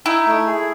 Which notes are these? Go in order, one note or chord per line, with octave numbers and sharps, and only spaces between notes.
D#4 E4
A3
G#4